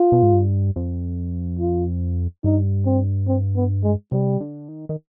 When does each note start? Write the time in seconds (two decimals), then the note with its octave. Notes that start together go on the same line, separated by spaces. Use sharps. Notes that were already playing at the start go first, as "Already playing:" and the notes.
Already playing: F4
0.12 B2
0.23 G#2
0.33 G2
0.76 F2
1.59 F4
2.44 G2 D#4
2.86 C4
3.28 C4
3.56 B3
3.84 G#3
4.12 C3 G3
4.40 D3
4.69 D#3
4.89 D#3